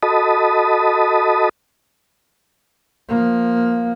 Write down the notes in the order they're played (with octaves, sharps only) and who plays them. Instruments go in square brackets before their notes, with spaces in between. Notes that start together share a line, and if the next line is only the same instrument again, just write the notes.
[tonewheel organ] F#4 A4 D#5 A5 B5 D#6
[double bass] F3 A#3